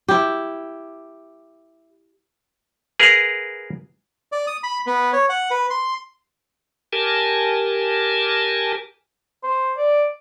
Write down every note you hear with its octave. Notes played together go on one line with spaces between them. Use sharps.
E4 G4
G#4 A#4 B4 F5
D5
D#6
B5
B3
C#5
F#5
B4
C6
G4 A#4 G#5 A5
C5
D5